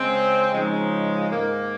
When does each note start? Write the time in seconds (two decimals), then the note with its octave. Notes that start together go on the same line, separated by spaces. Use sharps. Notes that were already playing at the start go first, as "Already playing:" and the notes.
Already playing: C#3 G#3 C4
0.52 C#3 F3 G#3 D#4
1.28 G#2 D#3 A#3